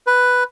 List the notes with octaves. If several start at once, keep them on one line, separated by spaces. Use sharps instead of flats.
B4